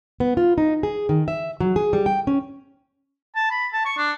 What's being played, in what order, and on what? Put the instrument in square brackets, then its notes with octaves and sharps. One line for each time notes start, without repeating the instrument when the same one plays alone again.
[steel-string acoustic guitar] B3
F4
D#4
G#4
D#3
E5
F#3
G#4
G3
G5
C#4
[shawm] A5
B5
A5
C#6
D4